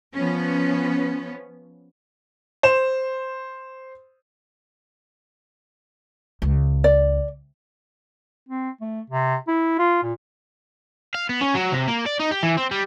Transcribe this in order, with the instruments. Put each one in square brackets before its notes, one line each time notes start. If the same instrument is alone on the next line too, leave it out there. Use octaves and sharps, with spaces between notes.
[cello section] F3 B3 C#4
[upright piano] C5 E7
[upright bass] C#2
[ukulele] D5
[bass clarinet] C4
A3
C3
E4
F4
A#2
[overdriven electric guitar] F5
B3
C#4
F#3
C3
A#3
D5
D#4
G4
E3
C4
G3